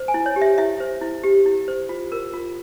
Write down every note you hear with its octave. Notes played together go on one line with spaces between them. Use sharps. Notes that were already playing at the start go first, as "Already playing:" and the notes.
Already playing: C5
G#5
E4
C#5
G4
E5
E4 E5
C5
E4
G4
E4
C5
F4
A#4
F4